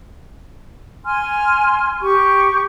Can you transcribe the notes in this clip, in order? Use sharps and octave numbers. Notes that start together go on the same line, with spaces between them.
G#5 C6 F6
G4 C#6